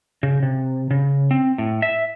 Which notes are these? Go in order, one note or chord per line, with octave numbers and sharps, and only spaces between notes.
C#3
C3
C#3
C4
A2
E5